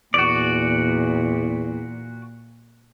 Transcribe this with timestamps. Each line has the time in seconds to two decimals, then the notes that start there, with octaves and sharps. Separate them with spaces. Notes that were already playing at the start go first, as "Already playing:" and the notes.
0.14 E2 A#2 F#4 D5